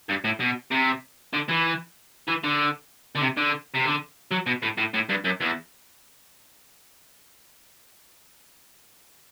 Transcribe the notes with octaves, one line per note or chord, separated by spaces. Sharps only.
G2
A2
B2
C3
D3
E3
E3
D3
D3
C3
D3
C3
D3
F#3
B2
A2
A2
A2
G2
F#2
E2